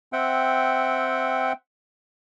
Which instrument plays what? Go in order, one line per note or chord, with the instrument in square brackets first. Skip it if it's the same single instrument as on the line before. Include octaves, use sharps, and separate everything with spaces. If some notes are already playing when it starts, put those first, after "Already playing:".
[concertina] C4 E5 F#5 G5